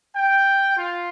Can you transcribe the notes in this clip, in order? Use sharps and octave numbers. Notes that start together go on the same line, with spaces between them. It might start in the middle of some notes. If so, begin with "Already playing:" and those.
G5
F4